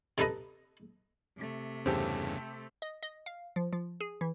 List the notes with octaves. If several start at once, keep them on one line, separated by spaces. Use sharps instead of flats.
C3 D#4 A4 B4 D#5
C3 A3
E2 G2 C#3 C4 G4 A4
D#5
D#5
F5
F3
F3
G#4
E3